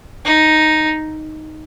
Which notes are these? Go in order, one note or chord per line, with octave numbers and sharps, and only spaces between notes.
D#4